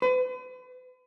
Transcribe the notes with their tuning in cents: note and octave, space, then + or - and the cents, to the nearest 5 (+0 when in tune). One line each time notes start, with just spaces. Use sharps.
B4 +45